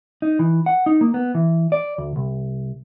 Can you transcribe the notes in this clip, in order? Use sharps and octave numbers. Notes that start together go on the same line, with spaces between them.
D#4
E3
F#5
D#4
A#3
B3
E3
D5
D2
C2